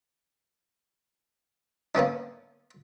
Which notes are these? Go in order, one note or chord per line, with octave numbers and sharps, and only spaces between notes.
A#3 B3 C#4 D4